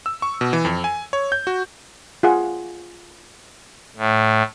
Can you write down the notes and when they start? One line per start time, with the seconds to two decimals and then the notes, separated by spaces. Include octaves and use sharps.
0.06 E6
0.22 C#6
0.41 B2
0.53 E3
0.65 F2
0.84 G#5
1.13 C#5
1.32 G6
1.47 F#4
2.23 F4 G#4 F#5
3.97 A2